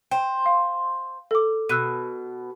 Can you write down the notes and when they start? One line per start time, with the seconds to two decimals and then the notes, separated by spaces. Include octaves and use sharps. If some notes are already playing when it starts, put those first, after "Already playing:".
0.11 C5 G5
0.46 F5
1.31 A4 D6
1.69 B2 E6 F#6 D#7